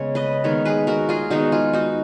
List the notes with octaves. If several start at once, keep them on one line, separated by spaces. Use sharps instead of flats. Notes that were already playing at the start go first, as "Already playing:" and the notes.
Already playing: C#3 G#3 B3 C#5
B4 D#5
D#3 G#3 B3 A#4 C#5
G#4 B4
F#4 A#4
F4 G#4
D#3 G#3 B3 D#4 F#4
F4 G#4
D#4 F#4